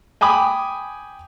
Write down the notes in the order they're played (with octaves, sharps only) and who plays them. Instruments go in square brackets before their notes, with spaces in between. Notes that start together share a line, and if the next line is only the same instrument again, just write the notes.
[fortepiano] G5 G#5 B5 D6 D#6